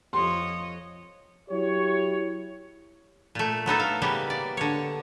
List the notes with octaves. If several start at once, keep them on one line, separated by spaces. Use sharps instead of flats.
F2 C#5 D#5 C6
F#3 E4 G4 C#5
A#2 A3
F#3 B3 D#4 A4
F5
C#3 G3 A#3 B3
D5
D3 C#5